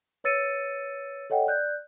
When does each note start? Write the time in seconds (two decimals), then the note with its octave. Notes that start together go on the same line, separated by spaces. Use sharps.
0.24 B4 C#5 E6 A6 C#7 D#7
1.30 A4 C#5 D#5 F#5 G5
1.47 D5 F#6 G6